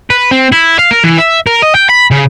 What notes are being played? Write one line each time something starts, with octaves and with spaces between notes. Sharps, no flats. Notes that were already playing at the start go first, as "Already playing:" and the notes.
B4
C4
E4
F5
A#4
E3
E5
A#4
D#5
G5
B5
C#3